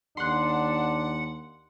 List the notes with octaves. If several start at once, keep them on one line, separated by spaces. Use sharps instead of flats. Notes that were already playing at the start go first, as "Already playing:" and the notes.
D#2 D4 F#5 C6 F#6